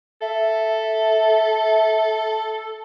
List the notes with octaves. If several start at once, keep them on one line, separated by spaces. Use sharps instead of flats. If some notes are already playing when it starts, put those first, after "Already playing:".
A4 E5